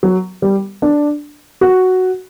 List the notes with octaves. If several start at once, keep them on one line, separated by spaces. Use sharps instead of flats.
F#3
G3
D4
F#4